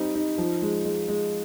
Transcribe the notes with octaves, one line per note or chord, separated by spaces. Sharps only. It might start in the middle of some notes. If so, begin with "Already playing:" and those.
Already playing: G3 C4 D#4
D#4
F3
G#3
G#3
G#3